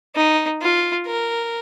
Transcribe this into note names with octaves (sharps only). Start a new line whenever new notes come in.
D#4
F4
A#4